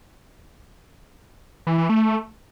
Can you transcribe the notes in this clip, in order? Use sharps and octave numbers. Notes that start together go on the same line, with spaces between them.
E3
E3
A3